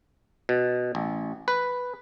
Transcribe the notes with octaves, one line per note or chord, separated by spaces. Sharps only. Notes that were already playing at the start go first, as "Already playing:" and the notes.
B2
A1
B4